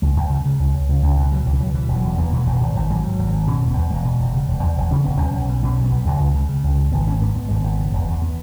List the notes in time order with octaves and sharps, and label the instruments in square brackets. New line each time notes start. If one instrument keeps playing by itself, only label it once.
[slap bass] C#2 G#3
C#2
C#3
C#3
C#2
C#2
C#2
C#2
B2
B2 F#3
C#2 E3
C#2 F#3
B2 E3
E1
F#3
E2
E1 B3
B2
G#3
E1
G#1
G#1 E3
G#2 F#3
G#2
G#1
G#1
B2 C#4
E1
B3
E2
E1 G#3
B2
E1
C#3
E1
E2
E1
C#3 C#4
E1 B3
B1 C#4
B1
B2
B2 C#4
B1
B3
B1
C#2 G#3
C#2
C#3
C#3
C#2
C#2
G#1 B3
G#1 C#4
G#2 B3
G#2 B3
G#1 G#3
G#1 B3
C#3
E1
E2
B3